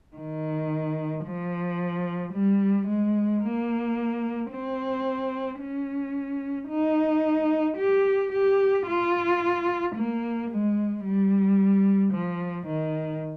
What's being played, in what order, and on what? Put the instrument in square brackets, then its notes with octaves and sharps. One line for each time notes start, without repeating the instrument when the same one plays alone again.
[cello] D#3
F3
G3
G#3
A#3
C4
C#4
D#4
G4
G4
F4
A#3
G#3
G3
F3
D#3